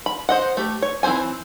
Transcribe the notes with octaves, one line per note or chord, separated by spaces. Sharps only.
B5
C5 D#5 F#5
A3 G4
C#5
E3 C4 G#4 C5 G#5